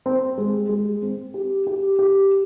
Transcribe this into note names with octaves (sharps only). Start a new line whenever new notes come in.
C4
G#3
G#3
C4
G4
G4
G4